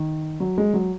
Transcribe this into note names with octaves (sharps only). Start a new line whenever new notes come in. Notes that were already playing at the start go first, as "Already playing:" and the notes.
Already playing: D#3
F#3
G#3
F#3